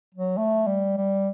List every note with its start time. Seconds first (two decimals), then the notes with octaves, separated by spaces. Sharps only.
0.15 F#3
0.37 A3
0.67 G3
0.97 G3